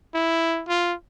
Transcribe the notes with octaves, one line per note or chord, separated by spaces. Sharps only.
E4
F4